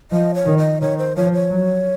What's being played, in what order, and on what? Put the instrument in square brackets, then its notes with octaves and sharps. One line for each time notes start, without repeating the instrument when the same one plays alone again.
[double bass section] F3 [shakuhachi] D#5
[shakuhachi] C#5
[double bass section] D#3
[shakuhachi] D#5
[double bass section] D#3 [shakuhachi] C#5
[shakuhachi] C5
[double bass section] F3 [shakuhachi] C#5
[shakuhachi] C#5
[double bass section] F#3